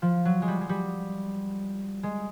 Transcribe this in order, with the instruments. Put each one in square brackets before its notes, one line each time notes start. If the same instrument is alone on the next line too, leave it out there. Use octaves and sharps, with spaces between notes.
[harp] F3
F#3
G#3
G3
G#3
G3
G#3